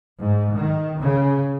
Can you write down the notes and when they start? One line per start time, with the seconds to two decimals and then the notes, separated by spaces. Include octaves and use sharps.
0.19 G#2
0.55 D#3
0.98 C#3